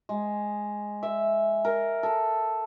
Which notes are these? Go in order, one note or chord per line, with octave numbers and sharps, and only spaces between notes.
G#3
E5
A#4
A4